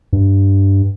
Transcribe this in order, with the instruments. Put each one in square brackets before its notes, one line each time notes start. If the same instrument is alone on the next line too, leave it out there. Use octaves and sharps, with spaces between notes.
[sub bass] G2